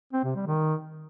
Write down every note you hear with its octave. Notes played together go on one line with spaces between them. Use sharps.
C4
C3
G3
D#3